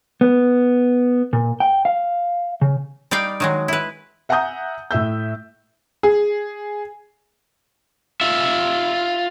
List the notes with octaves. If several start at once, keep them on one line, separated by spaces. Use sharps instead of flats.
B3
A#2
G5
F5
C#3
G3 D#4 D5 F5 G5
D#3 F#3 G#3
E4 B4
E5 F#5 G#5 A#5 D#6 G6
A2 E5 E6 G6
G#4
F4 E5